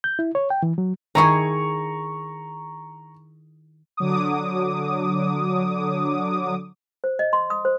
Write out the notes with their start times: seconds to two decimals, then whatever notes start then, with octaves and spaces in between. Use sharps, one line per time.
0.04 G6
0.19 E4
0.35 C#5
0.50 G5
0.63 E3
0.78 F#3
1.15 D#3 E4 G#4 A#5 C#6
3.97 D3 F#3 D6 D#6
7.04 C5
7.19 D#5
7.33 C6
7.50 D#6
7.65 C5